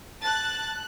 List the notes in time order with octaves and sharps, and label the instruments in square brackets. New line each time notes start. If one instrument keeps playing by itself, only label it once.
[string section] A5 F#6 [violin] A6